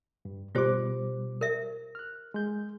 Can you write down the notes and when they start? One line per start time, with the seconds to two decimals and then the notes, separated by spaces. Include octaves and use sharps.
0.25 G2
0.55 B2 G3 F4 G4 C5 D6
1.41 A#4 E5
1.95 F6 F#6
2.34 G#3 G6